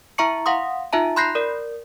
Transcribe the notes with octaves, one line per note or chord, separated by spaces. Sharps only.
E4 E5 A#5 C#6 C#7
F5 F#5 C6 D#6
D#4 F4 E5 A5 A#5
B5 C6 F#6 G6 A#6 C7
A#4 D5